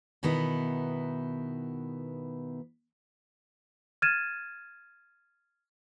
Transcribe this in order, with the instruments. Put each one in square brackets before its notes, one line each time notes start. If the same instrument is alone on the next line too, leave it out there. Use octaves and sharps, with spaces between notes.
[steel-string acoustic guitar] B2 D#3 B3 D#4 E4
[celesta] F6 G#6 A6 D#7 E7